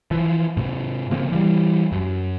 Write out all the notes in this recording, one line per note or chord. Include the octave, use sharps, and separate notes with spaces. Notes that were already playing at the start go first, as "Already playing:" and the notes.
E3 F3
G#2 C3
C#3 F3 A#3 C4
E3 G3
F#2